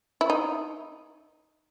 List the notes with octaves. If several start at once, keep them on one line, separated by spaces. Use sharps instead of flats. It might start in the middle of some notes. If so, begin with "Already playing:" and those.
E4
D#4